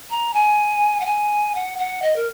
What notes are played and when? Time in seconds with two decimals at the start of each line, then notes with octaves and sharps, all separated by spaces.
0.10 A#5
0.34 G#5
1.00 F#5
1.06 G#5
1.55 F#5
1.78 F#5
2.02 D#5
2.16 A#4